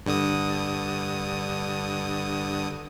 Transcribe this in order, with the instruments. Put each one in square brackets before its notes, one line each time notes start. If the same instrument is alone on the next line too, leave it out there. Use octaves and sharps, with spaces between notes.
[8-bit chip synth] G2 D3 D#6